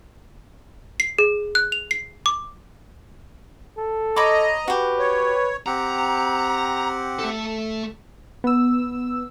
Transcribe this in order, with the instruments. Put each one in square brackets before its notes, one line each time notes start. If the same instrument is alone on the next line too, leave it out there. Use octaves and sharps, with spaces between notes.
[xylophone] C7
G#4
F#6
F7
C7
D6
[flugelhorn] A4
[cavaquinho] C#5 B5 D6 [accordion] D#5 A#5
[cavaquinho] F#4 G4 [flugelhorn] B4
[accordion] C#5
[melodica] C4 G4 F#5 [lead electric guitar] A#5
[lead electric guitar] A3 A4
[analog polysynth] B3 E6